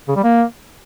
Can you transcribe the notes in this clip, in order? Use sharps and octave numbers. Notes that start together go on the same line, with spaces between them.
C#3
G3
A#3